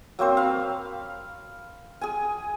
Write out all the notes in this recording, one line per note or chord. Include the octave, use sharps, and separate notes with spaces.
F#3 A#3 C4 C5
F5 B5
G#4 G#5